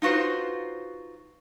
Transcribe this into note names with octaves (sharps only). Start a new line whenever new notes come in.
D#4 F4 F#4 B4 C5